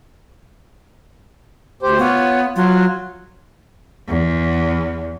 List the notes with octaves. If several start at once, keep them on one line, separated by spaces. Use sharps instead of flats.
D2 G4 C5
B3 F4 C#5
F#3 F4
E2